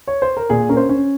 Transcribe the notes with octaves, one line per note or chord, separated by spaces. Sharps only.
C#5
C5
A#4
A#2 G#4
C#4 A#4
C5
C#4